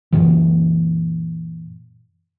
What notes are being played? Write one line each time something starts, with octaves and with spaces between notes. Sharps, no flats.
F#2 A#2 E3